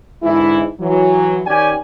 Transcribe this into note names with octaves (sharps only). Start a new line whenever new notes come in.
G#2 D3 E3 G#3 E4
E3 F#3
D#3 C#4 G4 D5 G#5